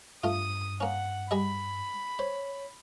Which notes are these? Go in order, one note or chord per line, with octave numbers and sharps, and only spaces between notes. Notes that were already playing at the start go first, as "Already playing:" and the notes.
G2 A3 F4 D#6 D#7
A#3 C#4 F#5
G3 G#4 D#5 B5
C5 C#5